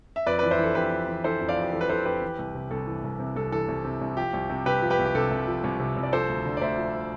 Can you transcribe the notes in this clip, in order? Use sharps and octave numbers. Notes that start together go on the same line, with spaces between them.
E5
F2 B4 D5
E3 B4 D5
C5 E5
E3 A4
F2 G4 B4
F2
E3
E3 A4 C5
F2
D5 F5
F2
G4
E3 A4
B4
E3 A4 C5
F2 G4 B4
E3
C2
C3
C2 A4
E3
C2
C3
C2 A4
E3 A4
C2
C3
C2
F3 G4
C2
C3
C2 G4 B4
F3
G4 B4
C2
G4
C3 A4
C2
F3
C2
C3
C2
D5
F3 A4 C5
D2
D3
D5
D2 C5 E5
F3